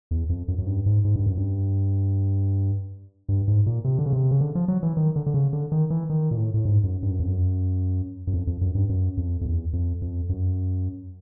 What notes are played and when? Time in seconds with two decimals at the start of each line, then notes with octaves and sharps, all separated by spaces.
0.11 E2
0.30 F2
0.48 F#2
0.58 F#2
0.67 G2
0.86 G#2
1.05 G#2
1.16 G2
1.26 F#2
1.37 G2
3.29 G2
3.48 G#2
3.66 A#2
3.84 C3
3.99 D3
4.06 C#3
4.13 C3
4.31 C#3
4.41 D3
4.55 F3
4.68 F#3
4.83 E3
4.97 D#3
5.16 D3
5.26 D3
5.34 C#3
5.53 D3
5.72 D#3
5.90 E3
6.10 D#3
6.31 A#2
6.37 A2
6.54 A2
6.65 G#2
6.84 F#2
7.03 G2
7.11 F#2
7.20 F2
7.28 F#2
8.27 F#2
8.33 F2
8.47 F2
8.61 F#2
8.75 G2
8.89 F#2
9.17 F2
9.41 F2
9.45 E2
9.73 F2
10.02 F2
10.29 F#2